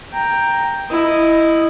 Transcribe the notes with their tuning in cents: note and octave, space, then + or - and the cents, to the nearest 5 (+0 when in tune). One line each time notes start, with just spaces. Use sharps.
G5 +5 A#5 +0
E4 +0 D#5 +0